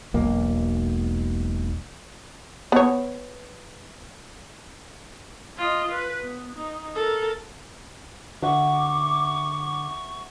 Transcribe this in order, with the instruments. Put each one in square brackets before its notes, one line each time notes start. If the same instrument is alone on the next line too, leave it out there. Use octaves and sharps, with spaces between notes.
[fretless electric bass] E1 B1 A#3
[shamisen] B3 C#5
[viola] F4 D#5
B4
B3
D#4
A4 A#4
[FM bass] D3 [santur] E5 F#5 [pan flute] C#6 [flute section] D6